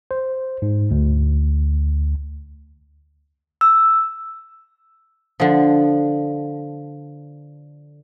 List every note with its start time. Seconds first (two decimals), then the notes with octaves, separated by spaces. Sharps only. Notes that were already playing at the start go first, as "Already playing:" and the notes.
0.11 C5
0.62 G#2
0.91 D2
3.61 E6
5.40 D3 F3